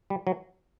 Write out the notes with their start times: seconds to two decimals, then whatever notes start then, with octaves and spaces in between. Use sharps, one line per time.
0.10 G3
0.27 F#3